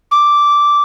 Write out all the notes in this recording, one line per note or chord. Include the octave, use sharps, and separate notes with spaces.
D6